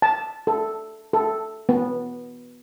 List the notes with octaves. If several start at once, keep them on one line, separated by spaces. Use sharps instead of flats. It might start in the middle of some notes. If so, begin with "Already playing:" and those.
A5
A4
A4
B3